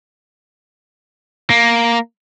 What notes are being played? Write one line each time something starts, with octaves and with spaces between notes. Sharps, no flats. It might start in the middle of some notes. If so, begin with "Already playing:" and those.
A#3